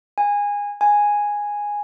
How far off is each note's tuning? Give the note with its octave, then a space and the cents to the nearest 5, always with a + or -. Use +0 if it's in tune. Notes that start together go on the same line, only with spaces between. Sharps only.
G#5 -20
G#5 -5